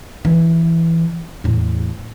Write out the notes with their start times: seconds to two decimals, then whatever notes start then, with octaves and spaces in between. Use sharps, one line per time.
0.25 E3
1.44 E2 A2